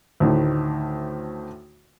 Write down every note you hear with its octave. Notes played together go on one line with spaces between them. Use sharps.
D2 A2 D#3